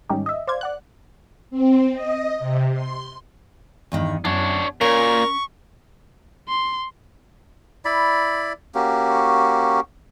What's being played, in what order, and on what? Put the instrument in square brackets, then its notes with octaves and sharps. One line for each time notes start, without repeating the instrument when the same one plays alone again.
[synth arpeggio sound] G#2 D#3 G3 C#4 D#4 G4
D#5 E5
C5 D5 F5 G#6
D5 F#5 F#6
[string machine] C4
D#5
C3
C6
[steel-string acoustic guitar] E2 G2 D#3
[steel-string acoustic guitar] F#2 [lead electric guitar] D4 C#5
[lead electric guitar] A#2 [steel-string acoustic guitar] C#4 [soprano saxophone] A#4 [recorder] C#6
[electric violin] C6
[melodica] E4 D5 B5
A#3 C#4 F#4 G4